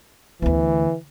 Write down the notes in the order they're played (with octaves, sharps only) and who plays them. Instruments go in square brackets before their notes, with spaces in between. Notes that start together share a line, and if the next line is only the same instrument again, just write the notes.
[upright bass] D2 B3 [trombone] E3